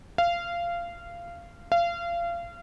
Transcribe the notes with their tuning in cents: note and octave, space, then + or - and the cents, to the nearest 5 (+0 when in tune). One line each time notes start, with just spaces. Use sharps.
F5 -20
F5 -30